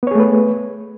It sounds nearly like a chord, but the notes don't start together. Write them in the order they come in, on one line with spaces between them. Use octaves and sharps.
B3 C#5 G#4 A3 B4